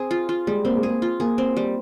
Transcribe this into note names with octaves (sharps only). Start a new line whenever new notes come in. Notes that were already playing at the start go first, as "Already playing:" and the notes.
Already playing: C4 G#4
F4
F4
G3 G#3
A#3 C4
G#3
A#3 G#4
F4
A#3 G#4
C4
G3